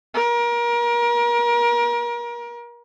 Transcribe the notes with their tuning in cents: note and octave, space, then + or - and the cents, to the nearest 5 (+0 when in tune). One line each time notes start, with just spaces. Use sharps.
A#4 +30